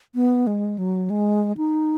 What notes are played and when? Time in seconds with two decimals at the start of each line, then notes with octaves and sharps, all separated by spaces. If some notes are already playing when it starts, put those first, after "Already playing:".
0.15 B3
0.47 G#3
0.78 F#3
1.10 G#3
1.57 D#4